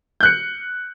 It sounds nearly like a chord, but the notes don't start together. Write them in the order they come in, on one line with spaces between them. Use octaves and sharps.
G6 F#6 C#7